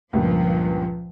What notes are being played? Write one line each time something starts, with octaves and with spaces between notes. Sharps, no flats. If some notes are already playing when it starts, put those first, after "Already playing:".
C#2 G2 A#2 F3